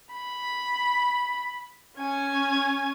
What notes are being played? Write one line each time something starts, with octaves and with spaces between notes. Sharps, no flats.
B5
C#4 G#5